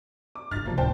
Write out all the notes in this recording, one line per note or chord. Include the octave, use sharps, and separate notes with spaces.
D6
G2 F4 F6 A6
E2 C3 F3 A#3
D1 C5 G5 A5